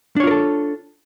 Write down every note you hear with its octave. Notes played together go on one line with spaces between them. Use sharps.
D4 F4 A4 A#4 C#5